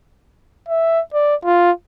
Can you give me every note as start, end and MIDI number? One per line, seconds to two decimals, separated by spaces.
0.69 1.00 76
1.13 1.35 74
1.44 1.71 65